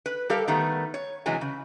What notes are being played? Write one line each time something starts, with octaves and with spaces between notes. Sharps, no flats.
B4
G3 G4 A4 A#4 F5
D#3 G3 A3 B3
C#5
C3 E3 F#3 G#3 G#5
C#3